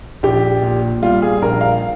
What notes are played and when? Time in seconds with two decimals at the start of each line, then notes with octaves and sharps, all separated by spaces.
0.23 A#1 G4
0.62 A#2
1.02 G3 F4
1.22 G#4
1.42 A#1 A#4
1.61 F5